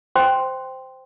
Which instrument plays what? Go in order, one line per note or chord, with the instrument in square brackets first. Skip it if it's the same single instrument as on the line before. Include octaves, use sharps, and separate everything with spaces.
[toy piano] C5 G5 C6